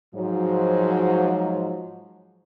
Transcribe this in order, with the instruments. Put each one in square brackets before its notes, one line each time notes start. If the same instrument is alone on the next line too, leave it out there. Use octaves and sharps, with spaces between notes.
[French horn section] G#2 F3 F#3